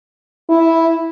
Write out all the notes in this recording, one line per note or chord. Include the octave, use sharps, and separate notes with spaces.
E4